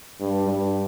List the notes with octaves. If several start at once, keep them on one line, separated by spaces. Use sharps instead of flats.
G2
G2